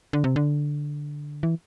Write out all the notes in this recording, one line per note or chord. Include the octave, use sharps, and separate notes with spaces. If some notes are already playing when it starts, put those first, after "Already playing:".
D3
C3
D3
E3